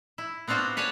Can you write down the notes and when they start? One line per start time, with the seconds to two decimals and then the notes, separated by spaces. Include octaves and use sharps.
0.18 E4
0.48 B3 C4 D4 F4 F#4
0.77 B4 C#5 D5 G#5 A5